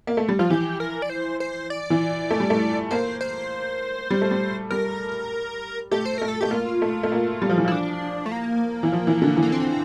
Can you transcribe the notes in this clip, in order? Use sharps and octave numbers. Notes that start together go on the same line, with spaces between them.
A#3
A3
G3
F3 F4
E3 G4
A#4
D5
C5
C5
D5
E3
A3
G3
A3
A#3 C5
C5
G3
A3
G3
G3 A#4
A3 G4
C5
A3 A#4
A4
A3 G4
A#3 F4
A3
A3
A#3
G3
F3
E3
F3 E4
D4
A3
A#3
E3
F3
E3
D3
E3
A#3
C4